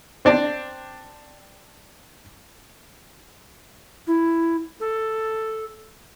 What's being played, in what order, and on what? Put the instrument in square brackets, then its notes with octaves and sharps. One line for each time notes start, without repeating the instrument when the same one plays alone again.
[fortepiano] C4 D4 D5
[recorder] E4
A4